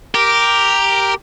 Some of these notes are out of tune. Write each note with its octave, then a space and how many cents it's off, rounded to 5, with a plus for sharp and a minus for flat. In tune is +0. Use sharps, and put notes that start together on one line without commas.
G4 +0 A#4 +0